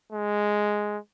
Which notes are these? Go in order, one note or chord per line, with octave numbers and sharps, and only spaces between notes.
G#3